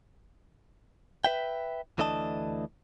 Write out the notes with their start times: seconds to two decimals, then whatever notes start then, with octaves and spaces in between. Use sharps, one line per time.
1.24 B4 E5 G5
1.98 D2 E3 A3 D4 D#5 A5